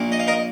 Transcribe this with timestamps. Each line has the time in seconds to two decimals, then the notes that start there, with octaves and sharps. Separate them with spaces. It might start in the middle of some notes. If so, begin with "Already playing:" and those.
Already playing: A#1 A#2 A#3
0.12 D#5
0.20 F5
0.27 A#4 D#5